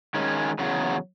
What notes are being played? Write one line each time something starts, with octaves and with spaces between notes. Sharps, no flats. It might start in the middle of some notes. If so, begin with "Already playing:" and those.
D#3 G#3 C#4
E2 C#3 F#3